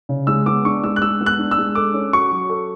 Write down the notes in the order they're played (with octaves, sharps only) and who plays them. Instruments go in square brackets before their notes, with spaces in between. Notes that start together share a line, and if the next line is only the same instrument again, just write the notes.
[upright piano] C#3
[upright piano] G#3 [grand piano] E6
[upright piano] B3 [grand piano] D6
[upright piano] D4 [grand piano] C#6
[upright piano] G#3 [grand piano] E6
[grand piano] F#6
[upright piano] G#3 [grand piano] E6
[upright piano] B3
[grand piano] F#6
[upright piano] D4
[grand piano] E6
[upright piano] G#3
[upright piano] A4 [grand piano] D6
[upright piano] C#4
[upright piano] F#4 [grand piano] C#6
[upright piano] F#3
A4